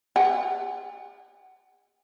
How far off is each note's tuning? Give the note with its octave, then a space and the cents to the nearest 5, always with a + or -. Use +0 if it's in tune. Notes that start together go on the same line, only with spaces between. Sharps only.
G#4 -45 F#5 +20